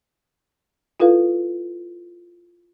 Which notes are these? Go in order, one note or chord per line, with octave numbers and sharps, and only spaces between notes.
E4 F4 A4 B4 F5